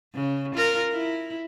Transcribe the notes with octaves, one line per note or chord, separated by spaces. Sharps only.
C#3
F4 A#4
E4